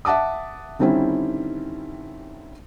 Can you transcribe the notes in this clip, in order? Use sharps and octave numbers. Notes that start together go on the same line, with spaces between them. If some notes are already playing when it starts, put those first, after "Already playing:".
E5 F#5 A5 D6 D#6
D3 D#3 G3 C4 C#4 E4